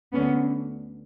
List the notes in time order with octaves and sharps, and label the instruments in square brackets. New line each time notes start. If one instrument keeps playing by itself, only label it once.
[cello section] D2 D3 B3 C#4